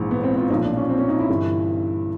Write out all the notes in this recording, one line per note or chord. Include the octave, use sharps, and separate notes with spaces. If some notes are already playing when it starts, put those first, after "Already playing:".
Already playing: A#1 G#2 E3
B3
C4
F4
B1 A#2 F3 D#4
D4
C#4
C4
C#4
D#4
E4
G1 G2 E3